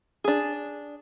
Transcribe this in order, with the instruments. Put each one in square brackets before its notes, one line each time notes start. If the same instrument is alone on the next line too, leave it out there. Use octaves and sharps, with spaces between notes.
[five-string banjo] D4 G#4